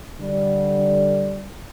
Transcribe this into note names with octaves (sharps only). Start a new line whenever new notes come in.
D3 G3